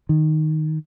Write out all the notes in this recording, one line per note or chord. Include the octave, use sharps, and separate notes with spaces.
D#3